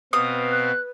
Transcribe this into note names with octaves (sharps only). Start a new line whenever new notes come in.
B2 C4 B4 F5 D#6
F#6